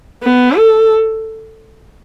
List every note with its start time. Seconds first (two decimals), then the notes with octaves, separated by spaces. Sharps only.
0.23 B3
0.57 A4